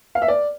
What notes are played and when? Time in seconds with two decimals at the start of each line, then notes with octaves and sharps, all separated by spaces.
0.15 F5
0.22 E5
0.28 D5